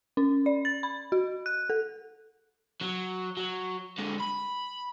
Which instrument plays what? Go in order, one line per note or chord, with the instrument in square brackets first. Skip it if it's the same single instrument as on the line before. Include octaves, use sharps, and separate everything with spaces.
[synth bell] C#4
D5
A6
B5
F#4
F#6
A4
[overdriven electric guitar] F#3
F#3
D3 G#3
B5